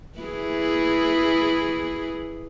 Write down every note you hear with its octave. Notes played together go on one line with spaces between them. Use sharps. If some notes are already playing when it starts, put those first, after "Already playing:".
E3 E4 G#4